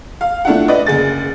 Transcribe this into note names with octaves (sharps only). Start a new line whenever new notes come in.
F5
A3 D4 E4 F4 F#5
B4 D5 D#5
F#1 G#4 A6